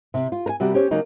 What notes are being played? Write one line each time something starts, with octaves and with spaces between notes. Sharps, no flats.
C3
F4
A#4 G#5
C3 G3 B3 F#4
C#4 G4 C5 C#5
C#3 F#3 A#3 D#4